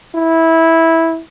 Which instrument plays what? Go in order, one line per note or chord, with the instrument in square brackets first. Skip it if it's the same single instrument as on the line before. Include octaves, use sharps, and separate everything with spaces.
[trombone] E4